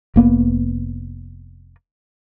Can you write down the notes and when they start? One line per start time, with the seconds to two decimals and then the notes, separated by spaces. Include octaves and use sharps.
0.16 F1 A#3 B3